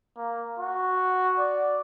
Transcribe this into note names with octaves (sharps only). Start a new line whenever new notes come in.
A#3
F#4
D5